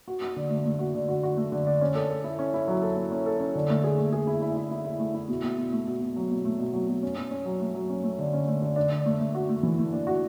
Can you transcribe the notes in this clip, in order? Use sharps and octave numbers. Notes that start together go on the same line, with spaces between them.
F#4
F#4
D3
A3
A3
F#4
D3
F#4
F#4
A3
D3
D4
C#4
A4
A4
E4
C#4
E4
F#3
A4
E4
C#4
A4
C#4
D3
A3
G#4
A3
G#4
E4
E4
E4
E4
E4
A3
E4
B2
B2
B2
A3
B2
B2
F#3
B2
A3
B2
F#3
B2
C#4
C#4
C#4
F#3
A3
F#3
C#4
A3
D3
C#4
A3
D3
D4
D4
A3
A3
F#4
A3
E3
A3
D4
F#4